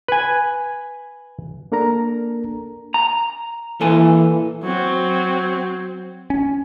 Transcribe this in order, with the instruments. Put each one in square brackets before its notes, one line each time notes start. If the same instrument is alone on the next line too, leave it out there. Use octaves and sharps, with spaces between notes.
[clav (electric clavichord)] B4 G#5
[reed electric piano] A#3 D4 A4 A#4 A#5
[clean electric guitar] A#5
[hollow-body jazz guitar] A#2 A4 G#5 [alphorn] E3
[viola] F#3 C4
[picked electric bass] C#4